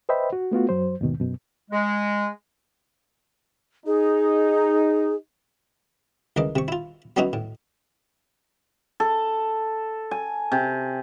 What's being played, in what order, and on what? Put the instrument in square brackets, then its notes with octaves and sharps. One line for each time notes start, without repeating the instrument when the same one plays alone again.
[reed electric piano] B4 C5 D#5 E5 G5 B5
F#4
A3 B3 F4 F#4
F#2 F#3 C5
D#2 G#2 B2 D#3
F#2 B2
[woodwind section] G#3
[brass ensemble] D#4 [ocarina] G#4
[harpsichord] C#2 E3 A#4 D#5 D6
C3 C#6
E4 F4
F#3 B3 C#4 D#4 E4 F#4
A2
[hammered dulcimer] A4
G#5
C3